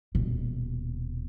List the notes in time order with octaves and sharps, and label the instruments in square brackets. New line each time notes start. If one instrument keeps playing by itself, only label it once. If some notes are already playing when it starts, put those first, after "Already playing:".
[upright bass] D#1 B2